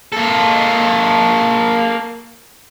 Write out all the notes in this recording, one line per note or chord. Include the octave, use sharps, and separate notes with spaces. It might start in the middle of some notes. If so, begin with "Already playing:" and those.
A#3 A4